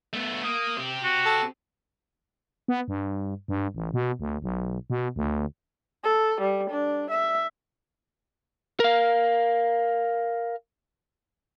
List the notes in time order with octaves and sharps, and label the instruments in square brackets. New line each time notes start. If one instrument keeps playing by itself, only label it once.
[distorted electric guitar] A3 B3
[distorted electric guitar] A#3 [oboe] D#6
[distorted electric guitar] C4 G4
[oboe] F#4
[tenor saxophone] A4
[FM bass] B3
G2
G2
A1
B2
D2
B1
B2
D2
[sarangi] A4
G3
D4
E5
[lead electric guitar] A#4 F5